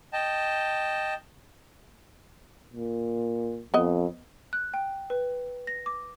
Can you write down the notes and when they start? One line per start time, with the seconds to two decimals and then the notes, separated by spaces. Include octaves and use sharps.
0.13 D#5 G5 A5
2.73 A#2
3.74 F2 B3 D#5
4.53 F#6
4.74 G5
5.10 B4
5.67 A#6
5.86 D6